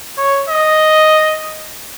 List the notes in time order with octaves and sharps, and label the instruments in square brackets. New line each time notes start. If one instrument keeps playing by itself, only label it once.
[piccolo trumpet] C#5
D#5